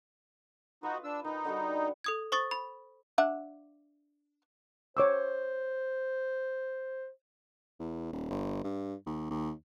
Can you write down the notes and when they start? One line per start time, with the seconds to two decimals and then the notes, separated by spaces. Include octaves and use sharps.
0.83 D#4 F4 F#4 B4
1.04 D4 E6
1.24 D#3 D#4 B4
1.45 D3 G3 F#4
2.04 A4 D#6 G#6
2.32 C5 C#6 D#6 A6
2.51 B5
3.18 D4 E5 F#5
4.97 C5 C#5 D6 E6
7.80 E2
8.13 D#1
8.30 G1
8.64 G2
9.06 D#2
9.31 D#2